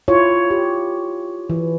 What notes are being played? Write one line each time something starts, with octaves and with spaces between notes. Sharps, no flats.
E4 F4 C#5
G4
E3